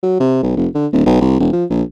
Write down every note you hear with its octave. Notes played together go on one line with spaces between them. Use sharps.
F#3
C3
B1
F1
D3
D1
B1
C2
E1
F3
A#1